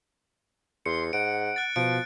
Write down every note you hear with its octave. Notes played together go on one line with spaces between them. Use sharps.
E2 C6 C#7
G#2 F#5 D7
F#6 A6
B2 F3 D7